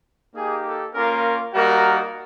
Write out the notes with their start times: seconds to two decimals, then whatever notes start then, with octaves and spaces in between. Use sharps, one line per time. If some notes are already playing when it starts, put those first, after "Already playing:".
0.35 A#3 D#4 G4 G#4
0.66 A4
0.94 A#3 C#4 F4 A#4
1.53 G3 A#3 D#4 F#4 A#4